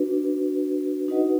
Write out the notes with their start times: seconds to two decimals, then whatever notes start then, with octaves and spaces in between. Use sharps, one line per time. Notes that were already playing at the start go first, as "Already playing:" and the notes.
Already playing: D4 F#4 B4
1.08 D#4 F#4 B4 D#5 F#5